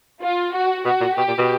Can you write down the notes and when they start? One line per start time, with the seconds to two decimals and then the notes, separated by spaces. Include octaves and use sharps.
0.22 F4
0.53 F#4
0.85 B2 F#4
1.00 A#2
1.16 B2 G4
1.27 A#2
1.38 B2